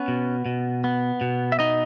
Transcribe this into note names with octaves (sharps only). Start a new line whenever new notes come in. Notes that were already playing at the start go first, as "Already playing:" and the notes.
Already playing: B3 C#4 B4
B2
B2
B3
B2
E5
B3 D#4 D#5